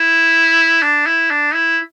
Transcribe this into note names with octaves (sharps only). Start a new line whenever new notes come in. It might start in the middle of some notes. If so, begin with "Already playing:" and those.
Already playing: E4
D4
E4
D4
E4